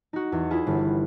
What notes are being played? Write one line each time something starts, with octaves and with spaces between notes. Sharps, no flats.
D#4 F#4
E2
E4 F4 G#4
G1